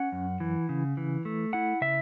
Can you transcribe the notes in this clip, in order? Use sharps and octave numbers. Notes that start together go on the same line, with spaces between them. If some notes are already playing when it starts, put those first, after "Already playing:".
Already playing: C#4 F#5
F#2
E3
C#3
E3
A3
E4 F#5
C#3 E5